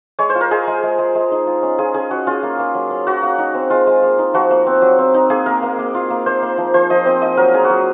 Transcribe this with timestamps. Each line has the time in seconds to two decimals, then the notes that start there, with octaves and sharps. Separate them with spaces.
0.19 G#3 C#5
0.30 C5
0.35 F4
0.41 A#4
0.51 G#3 G#4
0.67 G#3
0.83 G#3
0.99 G#3
1.15 G#3
1.31 D#4
1.47 F4
1.63 C#4
1.78 F4 G#4
1.94 C#4 G#4
2.11 C#4 F#4
2.27 C#4 F4
2.43 A#3
2.59 A#3
2.75 F#3
2.91 C#4
3.07 F#3 F#4
3.23 A#3
3.38 D#4
3.54 C4
3.70 G#3 F4
3.87 G#3
4.03 A#3
4.18 D#4
4.34 F3 F#4
4.51 A#3
4.67 C4
4.82 F#3
4.99 C4
5.14 D#4
5.30 A#3 G#4
5.46 A#3 A#4
5.63 A#3
5.78 A#3
5.95 F4
6.10 A#3
6.26 A#3 C5
6.42 A#3
6.58 F3
6.74 F3 C5
6.90 F3 D#5
7.06 C4 D#5
7.21 F4 D#5
7.37 F#3 A#4
7.54 F4 G#4
7.65 F#4
7.70 F#3